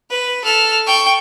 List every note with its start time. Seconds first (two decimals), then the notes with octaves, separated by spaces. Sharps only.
0.10 B4
0.44 A4 F6
0.87 G5 C#6